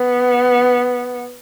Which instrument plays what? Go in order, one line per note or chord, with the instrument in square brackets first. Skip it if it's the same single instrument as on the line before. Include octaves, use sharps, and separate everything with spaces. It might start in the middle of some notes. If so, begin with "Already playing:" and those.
Already playing: [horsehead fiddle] B3